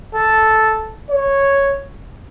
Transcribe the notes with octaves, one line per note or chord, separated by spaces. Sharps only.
A4
C#5